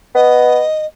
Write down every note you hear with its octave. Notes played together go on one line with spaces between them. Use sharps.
B3 D#5